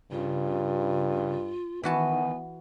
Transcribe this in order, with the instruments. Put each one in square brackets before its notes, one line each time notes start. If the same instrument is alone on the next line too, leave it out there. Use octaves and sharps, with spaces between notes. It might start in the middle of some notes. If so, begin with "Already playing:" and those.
[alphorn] G2 [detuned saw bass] C#3 [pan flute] F4
[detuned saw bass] D#3 [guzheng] E3 F#4 A5 [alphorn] B3 [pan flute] G#5